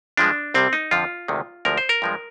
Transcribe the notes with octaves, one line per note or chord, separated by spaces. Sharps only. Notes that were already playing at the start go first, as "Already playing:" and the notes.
G2 F3 G#3 D4
C2 C3 G3 C4
D#4
F2 D3 F3 F4
D2 C3 D#3 G#3
D2 D3 F3 G#3 A#4
C5
A#4
G2 F3 G#3